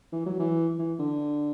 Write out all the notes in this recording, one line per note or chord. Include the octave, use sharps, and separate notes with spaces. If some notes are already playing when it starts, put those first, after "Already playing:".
E3
F#3
E3
E3
D3